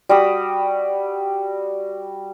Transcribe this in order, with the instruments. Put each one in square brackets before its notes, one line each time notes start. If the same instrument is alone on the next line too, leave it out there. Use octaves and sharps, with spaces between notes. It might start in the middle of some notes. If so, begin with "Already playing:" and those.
[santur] G3 F#4 B5 D#6